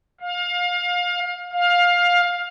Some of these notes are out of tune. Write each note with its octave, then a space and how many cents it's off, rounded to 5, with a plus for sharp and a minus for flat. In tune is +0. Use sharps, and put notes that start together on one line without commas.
F5 +25
F5 +15